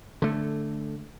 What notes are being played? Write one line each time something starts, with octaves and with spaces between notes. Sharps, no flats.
D3 A3